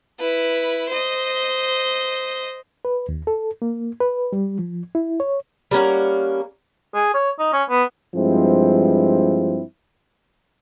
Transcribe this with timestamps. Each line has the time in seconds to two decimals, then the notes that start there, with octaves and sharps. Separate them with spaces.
0.19 E4 B4
0.89 C5 D#5
2.85 B4
3.09 D#2
3.27 A4
3.62 A#3
4.00 B4
4.33 G3
4.59 F3
4.95 E4
5.20 C#5
5.71 G3 A#3 C#4 F#5
6.95 G#4
7.14 C#5
7.39 D#4
7.53 C#4
7.69 B3
8.14 G2 F3 G#3 C4 E4